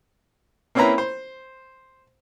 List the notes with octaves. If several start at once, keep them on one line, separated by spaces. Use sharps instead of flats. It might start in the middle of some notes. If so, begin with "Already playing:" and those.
A#3 C4 C#4 E4 B4 A#5
C5